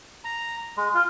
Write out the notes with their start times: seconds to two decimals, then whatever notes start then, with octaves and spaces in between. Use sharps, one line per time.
0.24 A#5
0.77 G#3
0.94 F4